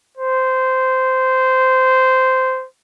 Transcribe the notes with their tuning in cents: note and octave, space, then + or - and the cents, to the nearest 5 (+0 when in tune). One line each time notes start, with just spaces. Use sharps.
C5 -15